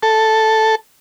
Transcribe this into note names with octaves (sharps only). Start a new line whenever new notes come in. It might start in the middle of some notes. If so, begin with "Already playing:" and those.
A4